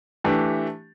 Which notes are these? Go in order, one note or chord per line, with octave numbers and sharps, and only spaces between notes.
E3 A3 D4 G4